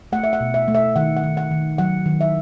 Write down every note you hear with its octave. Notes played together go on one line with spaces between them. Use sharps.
A3 F#5
E5
F#5
B2
E5
A3
E5
D#3 F#5
F#5
D#3
F#5
D#3
F#3 F#5
D#3
E5